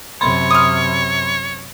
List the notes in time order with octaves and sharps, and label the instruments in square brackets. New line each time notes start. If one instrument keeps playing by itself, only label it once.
[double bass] F#2 C3 [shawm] C#5 [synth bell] B5 C6
[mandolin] D#6 F6